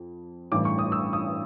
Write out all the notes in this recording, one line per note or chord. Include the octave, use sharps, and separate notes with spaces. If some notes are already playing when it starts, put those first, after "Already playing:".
Already playing: F2
A1 G2 E3 A3 D6
C#6
D#6
E6
D#6